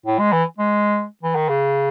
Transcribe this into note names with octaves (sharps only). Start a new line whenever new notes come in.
A2
G#3
E3
G#3
E3
D#3
C#3